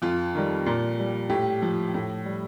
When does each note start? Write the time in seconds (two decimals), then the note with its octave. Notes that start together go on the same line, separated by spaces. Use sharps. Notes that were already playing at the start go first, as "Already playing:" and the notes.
0.02 F2 F4
0.35 D#3 G3
0.66 A#2
0.99 G3
1.29 A2 G4
1.62 F3
1.94 A2
2.25 G3